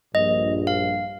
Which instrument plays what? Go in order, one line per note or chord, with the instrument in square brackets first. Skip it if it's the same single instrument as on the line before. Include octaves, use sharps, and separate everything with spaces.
[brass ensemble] A#1 G2 [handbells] D#5
[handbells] F5